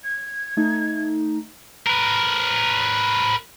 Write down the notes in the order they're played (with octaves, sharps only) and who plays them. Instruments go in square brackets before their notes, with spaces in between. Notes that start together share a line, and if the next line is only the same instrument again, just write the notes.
[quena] G#6
[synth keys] A3 D#4
[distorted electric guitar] A#4 B4